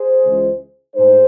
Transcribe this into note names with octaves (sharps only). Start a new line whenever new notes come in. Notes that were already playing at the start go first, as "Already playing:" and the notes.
Already playing: G#4 C5
C#2 C#3 E3 G#3
A2 G#3 D#4 G#4 C5